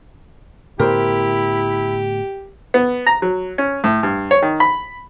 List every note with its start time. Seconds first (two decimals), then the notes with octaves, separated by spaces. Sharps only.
0.79 A2 D3 B3 E4 G4 A#4 C5
2.74 B3
3.06 A#5
3.22 F#3
3.58 C#4
3.84 A2
4.03 G2
4.31 C#5
4.42 D#3
4.60 B5